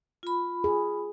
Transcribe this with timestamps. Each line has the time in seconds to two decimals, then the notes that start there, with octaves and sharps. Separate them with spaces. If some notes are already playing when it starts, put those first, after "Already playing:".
0.23 F4 B5
0.64 G#4